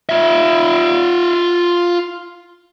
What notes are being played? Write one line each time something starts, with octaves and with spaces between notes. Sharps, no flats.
F4 E5